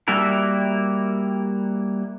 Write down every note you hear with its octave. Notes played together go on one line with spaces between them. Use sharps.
G3 A#3 E4 F#4 A#4